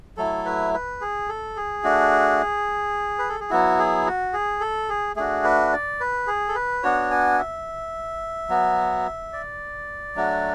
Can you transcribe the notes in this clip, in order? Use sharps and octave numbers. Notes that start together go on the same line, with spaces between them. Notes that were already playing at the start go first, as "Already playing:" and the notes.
F#3 A3 E4 A4
B4
B4
G#4
A4
G#4
A3 D4 F#4
B4
A4
G#4
F#3 B3 E4 F#4
G#4
F#4
G#4
A4
G#4
A3 D4 F#4 G#4
B4
D5
B4
G#4
A4
B4
B3 D4 F#4 C#5
G#5
E5
F#3 B3 F#4
D5
F#3 A3 D4 F#4